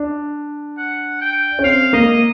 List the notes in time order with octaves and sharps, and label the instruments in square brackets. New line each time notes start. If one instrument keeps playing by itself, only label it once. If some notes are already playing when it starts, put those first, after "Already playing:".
Already playing: [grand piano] D4
[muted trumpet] F#5
G5
[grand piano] C#4
[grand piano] C4 [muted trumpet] F5
[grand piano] A#3 [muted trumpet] D#5